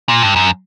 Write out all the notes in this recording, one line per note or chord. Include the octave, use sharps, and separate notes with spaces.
A#2
G2
F#2